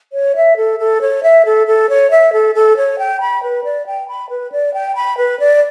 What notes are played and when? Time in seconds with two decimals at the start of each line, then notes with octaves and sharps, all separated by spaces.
0.13 C#5
0.36 E5
0.57 A4
0.79 A4
1.01 C#5
1.23 E5
1.45 A4
1.67 A4
1.89 C#5
2.11 E5
2.33 A4
2.55 A4
2.77 C#5
2.99 G5
3.21 B5
3.43 B4
3.64 D5
3.86 G5
4.08 B5
4.30 B4
4.52 D5
4.74 G5
4.96 B5
5.17 B4
5.40 D5